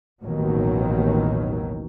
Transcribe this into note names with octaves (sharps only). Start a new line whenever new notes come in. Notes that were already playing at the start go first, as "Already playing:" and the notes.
A1 D#2 B2 D#3 F#3